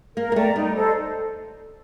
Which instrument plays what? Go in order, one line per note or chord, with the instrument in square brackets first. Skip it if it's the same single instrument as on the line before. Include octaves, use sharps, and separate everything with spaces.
[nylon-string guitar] A#3 [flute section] A#4
[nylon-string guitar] A#3
[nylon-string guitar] A3 [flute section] D5 G5 A#5
[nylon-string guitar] G3 [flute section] D#4
[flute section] A4 C5 D#5